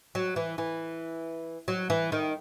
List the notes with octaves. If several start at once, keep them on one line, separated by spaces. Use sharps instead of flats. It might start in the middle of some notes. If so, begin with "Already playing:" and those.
F#3
E3
E3
F#3
E3
D#3